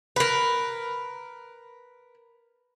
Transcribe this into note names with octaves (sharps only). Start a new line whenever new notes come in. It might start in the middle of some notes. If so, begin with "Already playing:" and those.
A#4 B4